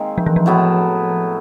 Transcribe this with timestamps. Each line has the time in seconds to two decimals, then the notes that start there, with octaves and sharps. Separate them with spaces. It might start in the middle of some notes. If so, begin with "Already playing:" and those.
Already playing: D#3 G#3 A#3 C4
0.18 F3
0.26 E3
0.36 F3
0.46 A2 F#3 B3 E4